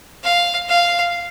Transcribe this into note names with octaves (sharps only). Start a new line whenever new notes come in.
F5
F5